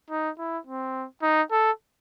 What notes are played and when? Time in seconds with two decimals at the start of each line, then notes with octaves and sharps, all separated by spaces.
0.10 D#4
0.38 E4
0.67 C4
1.22 D#4
1.51 A4